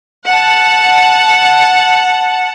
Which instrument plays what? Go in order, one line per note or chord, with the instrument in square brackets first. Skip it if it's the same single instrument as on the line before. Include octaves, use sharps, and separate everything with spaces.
[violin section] F#5 A5